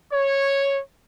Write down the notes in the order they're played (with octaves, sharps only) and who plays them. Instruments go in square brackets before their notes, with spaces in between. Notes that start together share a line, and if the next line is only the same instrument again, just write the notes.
[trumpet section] C#5